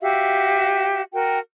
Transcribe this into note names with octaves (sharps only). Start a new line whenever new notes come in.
F#4 G4 E5 F5
F#4 A#4 G5